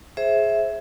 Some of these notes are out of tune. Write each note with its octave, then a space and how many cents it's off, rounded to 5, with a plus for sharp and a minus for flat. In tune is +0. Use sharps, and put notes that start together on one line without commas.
G#4 +15 C5 +20 E5 +0